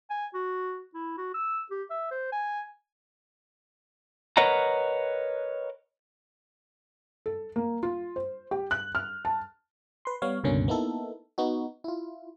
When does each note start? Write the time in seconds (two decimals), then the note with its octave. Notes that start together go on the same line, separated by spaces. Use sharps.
0.10 G#5
0.34 F#4
0.94 E4
1.18 F#4
1.34 E6
1.71 G4
1.90 E5
2.11 C5
2.32 G#5
4.37 A#4 B4 C#5 D#5 F#5 A#5
7.26 A4
7.56 A#3
7.83 F4
8.16 C5
8.51 G4
8.71 F#6
8.95 F6
9.25 A5
10.05 B4 C6
10.22 G3 B3 C#5 F5
10.44 C#2 G2 B2 D3 A#3 C#4
10.68 A#3 B3 D#4 E4 A4
11.38 B3 D#4 F#4
11.84 E4 F4